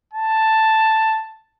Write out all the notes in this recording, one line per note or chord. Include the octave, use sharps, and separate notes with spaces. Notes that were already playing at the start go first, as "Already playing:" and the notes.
A5